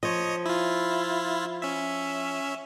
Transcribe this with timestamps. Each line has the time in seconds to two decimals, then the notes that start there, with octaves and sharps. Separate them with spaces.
0.03 F3 C#5 D#5
0.45 E4 F4
1.62 C#4 E5